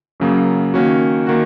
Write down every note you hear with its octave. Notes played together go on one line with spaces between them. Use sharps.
F#2 C#3 F#3 A#3
D#3 A#3 C#4 F#4
D#3 A#3 F#4